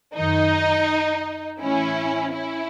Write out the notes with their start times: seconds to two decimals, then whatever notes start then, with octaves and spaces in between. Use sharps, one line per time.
0.15 F#2 D#3 D#4
1.60 A2 E3 C#4 E4
2.32 C#4 E4